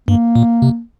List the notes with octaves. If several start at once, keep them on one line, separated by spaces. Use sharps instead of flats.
G2 A#3
A#2
C3